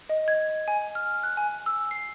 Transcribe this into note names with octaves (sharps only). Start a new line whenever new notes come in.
D#5
G#6
G#5
F6
F#6
G#5
E6
C7